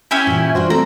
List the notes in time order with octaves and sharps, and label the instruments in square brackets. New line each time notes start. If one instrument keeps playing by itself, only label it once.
[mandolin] C#4 E4 G4 [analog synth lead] G#5
[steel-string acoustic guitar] A#2 E3
[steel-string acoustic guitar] D4 F4 F#4 [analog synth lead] C5
[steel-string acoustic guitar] G3 C4 [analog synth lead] A3 [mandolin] A#5